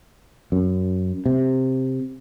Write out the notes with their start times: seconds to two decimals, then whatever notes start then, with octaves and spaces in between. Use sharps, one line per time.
0.52 F#2
1.26 C3